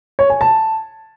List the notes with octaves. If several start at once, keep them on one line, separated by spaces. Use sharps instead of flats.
C#5
G#5
A5